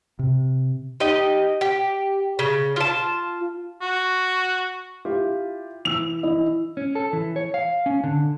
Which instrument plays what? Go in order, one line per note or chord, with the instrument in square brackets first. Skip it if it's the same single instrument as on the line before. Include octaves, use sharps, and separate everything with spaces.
[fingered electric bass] C3
[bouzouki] D#4 G4 D#5
G4
C#3
F4 A5
[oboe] F#4
[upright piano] E4 F4 G4
[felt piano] E3 E6 [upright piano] F7
[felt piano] E3 E4 D#5
[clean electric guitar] C#4
A4
E3
C#5
F5
C#4
D3